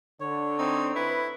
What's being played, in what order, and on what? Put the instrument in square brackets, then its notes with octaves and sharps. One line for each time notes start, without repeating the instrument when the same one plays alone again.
[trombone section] D3 [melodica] C#5
[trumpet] C4 [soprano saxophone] D#4
[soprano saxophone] E4 [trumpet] B4